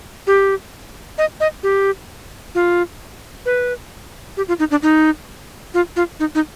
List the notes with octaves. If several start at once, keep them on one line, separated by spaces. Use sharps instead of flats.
G4
D#5
D#5
G4
F4
B4
G4
F4
D#4
D4
D#4
F4
F4
D#4
D#4